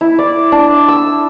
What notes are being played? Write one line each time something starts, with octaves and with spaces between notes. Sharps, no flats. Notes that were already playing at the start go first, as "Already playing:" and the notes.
E4
D5
D4
E6